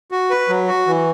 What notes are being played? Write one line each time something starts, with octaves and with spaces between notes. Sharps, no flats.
F#4
B4
F#3
F#4
E3